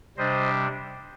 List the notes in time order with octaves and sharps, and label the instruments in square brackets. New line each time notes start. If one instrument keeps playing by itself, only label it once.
[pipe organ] C3 G3 D4 C5 D#5